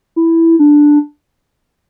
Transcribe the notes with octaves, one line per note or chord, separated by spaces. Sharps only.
E4
D4